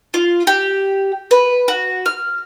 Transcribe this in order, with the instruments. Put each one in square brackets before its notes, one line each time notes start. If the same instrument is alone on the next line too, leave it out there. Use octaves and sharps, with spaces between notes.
[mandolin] F4
G4
B4
F#4
F6